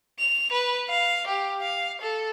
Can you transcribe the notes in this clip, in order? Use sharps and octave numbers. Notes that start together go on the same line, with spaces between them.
F7
B4
F5
G4
F5
A4